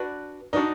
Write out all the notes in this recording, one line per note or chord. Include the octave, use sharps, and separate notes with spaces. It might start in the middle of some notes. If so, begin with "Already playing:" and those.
Already playing: D4 F#4 B4 D5
D4 D#4 F#4 B4 D5